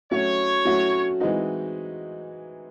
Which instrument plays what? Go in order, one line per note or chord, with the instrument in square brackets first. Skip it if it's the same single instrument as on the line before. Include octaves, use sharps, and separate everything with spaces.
[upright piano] F#3 A3 C#4 F#4 [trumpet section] C#5
[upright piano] F#3 A3 C#4 F#4
E3 G#3 C4 D#4 F#4